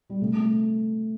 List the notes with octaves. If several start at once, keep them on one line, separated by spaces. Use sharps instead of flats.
G3
C3 A3
A3